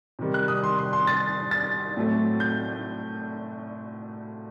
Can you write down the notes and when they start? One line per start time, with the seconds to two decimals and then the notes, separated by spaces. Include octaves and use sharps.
0.19 C3 D#3 G3
0.34 F#6
0.48 D#6
0.64 C6
0.79 C6
0.93 C6
1.07 A6
1.51 A6
1.97 A2 F#3 A3 C4
2.40 G6